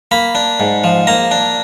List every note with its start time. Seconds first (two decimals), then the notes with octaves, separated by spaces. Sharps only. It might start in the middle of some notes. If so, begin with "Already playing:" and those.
0.11 A#3 B5
0.35 D4
0.60 G#2
0.84 F3
1.07 A#3 A#5
1.31 D4